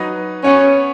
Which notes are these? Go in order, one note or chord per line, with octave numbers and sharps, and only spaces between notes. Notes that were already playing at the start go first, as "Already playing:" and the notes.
Already playing: F#3 D#4 B4 D#5
B3 C#4 F#4 C#5